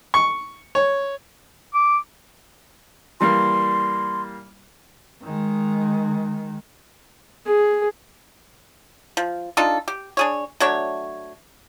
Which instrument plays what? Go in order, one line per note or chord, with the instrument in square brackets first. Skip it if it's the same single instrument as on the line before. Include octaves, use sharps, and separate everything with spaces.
[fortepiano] C#6
C#5
[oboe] D6
[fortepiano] E3 G3 A#3 [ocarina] C6
[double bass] D#3 G#3
[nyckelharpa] G#4
[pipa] F3
D4 D#4 F4 A4
G4
D4 G#4 C#5
F#3 A3 D4 C#5